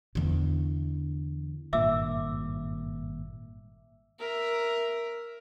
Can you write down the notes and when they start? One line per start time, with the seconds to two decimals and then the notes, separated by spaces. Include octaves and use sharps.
0.15 E2 D3
1.73 G#1 G2 A#2 E5 D6 E6
4.19 A#4 E5